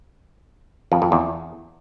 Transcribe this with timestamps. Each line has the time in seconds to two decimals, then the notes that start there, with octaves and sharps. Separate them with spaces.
0.92 F2
1.02 F2
1.12 E2